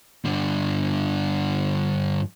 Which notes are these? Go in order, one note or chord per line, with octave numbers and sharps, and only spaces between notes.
G2 D3